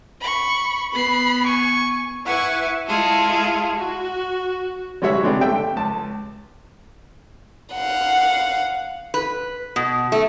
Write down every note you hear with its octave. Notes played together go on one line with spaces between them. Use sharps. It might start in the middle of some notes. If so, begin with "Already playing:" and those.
B5 C#6
B3 B5 C7
G#5 C#6
E4 B4 E5 F#5 G#5 C#6
G#3 E4 F4 G#4 A4
F#4
G3 G#3 F#4 C#5 E5
G#3 B3 C4 D4 G4
A3 E5 G5
C#2 A5
F5 F#5
B4
B2
A3